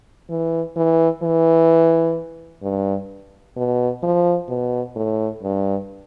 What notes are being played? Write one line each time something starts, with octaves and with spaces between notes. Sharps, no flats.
E3
E3
E3
G2
B2
F3
B2
A2
G2